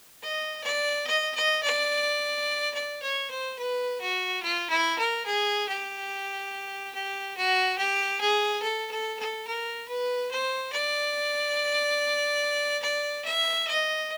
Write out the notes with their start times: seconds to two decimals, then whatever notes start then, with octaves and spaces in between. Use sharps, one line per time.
0.22 D#5
0.63 D5
1.07 D#5
1.35 D#5
1.63 D5
2.74 D5
3.02 C#5
3.30 C5
3.59 B4
4.01 F#4
4.42 F4
4.70 E4
4.98 A#4
5.26 G#4
5.68 G4
6.95 G4
7.37 F#4
7.78 G4
8.20 G#4
8.62 A4
8.91 A4
9.19 A4
9.47 A#4
9.88 B4
10.31 C5
10.72 D5
12.82 D5
13.24 E5
13.67 D#5